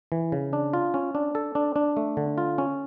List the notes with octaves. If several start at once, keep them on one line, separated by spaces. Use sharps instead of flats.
E3
C#3
D4
F4
C#4
D4
A4
D4
D4
A3
D3
F4
C#4